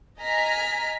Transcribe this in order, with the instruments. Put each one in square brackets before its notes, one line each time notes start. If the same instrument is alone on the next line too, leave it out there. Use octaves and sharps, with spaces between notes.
[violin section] D#5 G#5 A#5 F6 B6